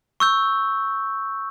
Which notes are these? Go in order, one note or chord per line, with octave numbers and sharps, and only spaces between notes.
C#6 E6 G6